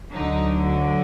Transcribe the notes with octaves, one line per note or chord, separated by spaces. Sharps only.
D2 D3 F#3 D#4